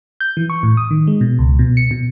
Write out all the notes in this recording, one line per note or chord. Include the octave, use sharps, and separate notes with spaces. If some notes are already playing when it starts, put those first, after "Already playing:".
G6
E3
C#6
A2
D#6
D#3
G#3
B2
C#2
B2
C#7
B2